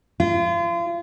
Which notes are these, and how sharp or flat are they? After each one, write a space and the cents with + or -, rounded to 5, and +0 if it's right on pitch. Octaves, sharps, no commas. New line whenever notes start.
F4 -35